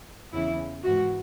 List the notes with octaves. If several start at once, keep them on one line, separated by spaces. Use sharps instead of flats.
E2 C#3 E3 E4
G#2 E3 F#4